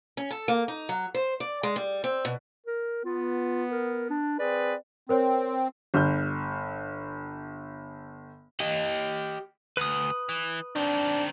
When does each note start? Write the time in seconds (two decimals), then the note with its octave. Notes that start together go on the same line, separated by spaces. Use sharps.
0.17 C#4
0.31 A4
0.48 A#3
0.68 D#4
0.89 F#3
1.15 C5
1.40 D5
1.63 G#3
1.76 G3
2.04 C4
2.25 B2
2.66 A#4
3.05 B3 F4
3.71 A#4
4.10 D4
4.39 C4 G#4 B4 D5
5.09 C4 A#4 C5 C#5
5.94 G1 F6 G6
8.60 G4 D#5
9.77 D2 B4 D#6
10.29 E3
10.76 D#3 C4 D4